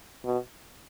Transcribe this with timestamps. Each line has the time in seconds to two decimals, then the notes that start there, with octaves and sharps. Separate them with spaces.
0.25 B2